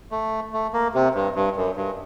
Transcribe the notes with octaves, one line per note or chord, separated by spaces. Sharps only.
A3
A3
A#3
C3
G2
G2
F#2
G2